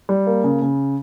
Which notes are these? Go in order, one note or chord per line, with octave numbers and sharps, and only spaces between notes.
G3
A#3
C#3
C#3